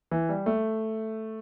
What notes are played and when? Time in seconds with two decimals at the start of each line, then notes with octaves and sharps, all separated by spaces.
0.11 E3
0.29 G3
0.46 A3